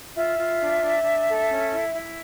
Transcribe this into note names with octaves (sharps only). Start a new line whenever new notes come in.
F4 E5
F4
D4
D4
D4
A4
C#4
E4
E4